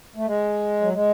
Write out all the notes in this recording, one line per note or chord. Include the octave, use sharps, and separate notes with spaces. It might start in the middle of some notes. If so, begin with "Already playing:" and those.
A3
G#3
F#3
G#3